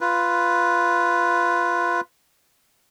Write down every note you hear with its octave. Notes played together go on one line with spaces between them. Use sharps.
F4 B4